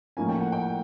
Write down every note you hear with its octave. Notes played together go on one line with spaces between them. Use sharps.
A2 F3 A#3 C#4 G#5
G5
F#5
G5